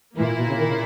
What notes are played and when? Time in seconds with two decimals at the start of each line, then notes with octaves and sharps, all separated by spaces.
0.17 A#2 E3 A#3 E4
0.37 B2
0.48 C#3
0.58 D#3
0.68 C#3